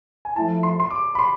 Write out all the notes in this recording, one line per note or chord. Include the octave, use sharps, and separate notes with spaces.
G#5
F3 A3 E4 A5
C6
C6
D6
B5
C6